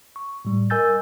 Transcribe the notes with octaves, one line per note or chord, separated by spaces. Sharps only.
C#6
A2 G3
A#4 D#5 G#5 E6 G6 A6